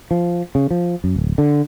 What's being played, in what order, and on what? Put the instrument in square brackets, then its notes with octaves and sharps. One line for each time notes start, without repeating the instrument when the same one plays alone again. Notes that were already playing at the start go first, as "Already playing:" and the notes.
[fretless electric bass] F3
C#3
F3
F#2
D1
D3